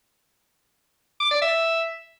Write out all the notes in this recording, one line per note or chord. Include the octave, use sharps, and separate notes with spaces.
D6
D5
E5